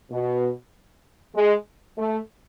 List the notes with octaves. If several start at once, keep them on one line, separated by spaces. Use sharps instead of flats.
B2
G#3
A3